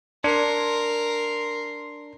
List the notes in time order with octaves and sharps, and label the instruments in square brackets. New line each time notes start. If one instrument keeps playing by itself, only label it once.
[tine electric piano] D4 [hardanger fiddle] A#4 [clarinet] C6